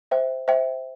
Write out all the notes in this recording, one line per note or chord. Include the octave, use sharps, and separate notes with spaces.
C5 E5 G5
C5 E5 G5